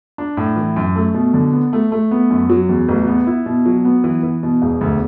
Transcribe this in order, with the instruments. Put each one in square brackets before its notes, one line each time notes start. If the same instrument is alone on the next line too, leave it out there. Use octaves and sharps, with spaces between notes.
[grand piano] D4
A2
E3
F#2
A3
B2
D3
B3
A3
A3
B3
F#2
F#3
E2
A1
B3
E4
B2
F#3
B3
E3
E3
B2
E1
D2